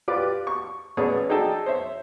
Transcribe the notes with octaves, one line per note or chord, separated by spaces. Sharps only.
F4 G4 B4 D5 D6
C#6
A1 B3 G#4 C#5 D5
D4 D#4 G#4 A4 G5 A5
C5 C#5 E5